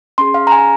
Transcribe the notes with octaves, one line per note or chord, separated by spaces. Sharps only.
C#4 G#4 C6
F5
A#5
G#5